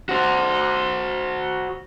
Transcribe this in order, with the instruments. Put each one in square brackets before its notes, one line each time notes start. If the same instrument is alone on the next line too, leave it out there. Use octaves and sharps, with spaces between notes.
[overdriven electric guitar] F#4 C5